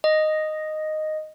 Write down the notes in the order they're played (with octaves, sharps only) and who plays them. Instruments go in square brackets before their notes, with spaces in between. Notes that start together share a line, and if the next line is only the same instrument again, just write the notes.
[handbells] D#5